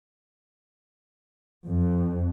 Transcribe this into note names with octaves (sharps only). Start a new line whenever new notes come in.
F2